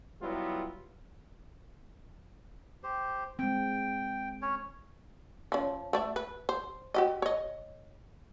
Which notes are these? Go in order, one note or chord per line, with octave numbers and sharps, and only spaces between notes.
F#3 G3 B3 E4 F4
G4 C5
G#3 C4 G5
C#4 C#5
F3 C#4
A3 D5 E5
B4
C5
F#4 G4 D#5
C#5 D#5